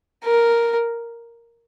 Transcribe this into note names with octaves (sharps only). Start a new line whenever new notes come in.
A#4